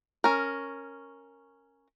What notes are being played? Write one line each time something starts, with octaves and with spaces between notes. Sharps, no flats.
C#4 A#4